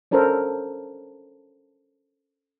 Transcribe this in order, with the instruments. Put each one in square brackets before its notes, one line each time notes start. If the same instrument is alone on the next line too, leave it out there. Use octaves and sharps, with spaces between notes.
[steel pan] C#4 D4 A4 A#4 C5 A5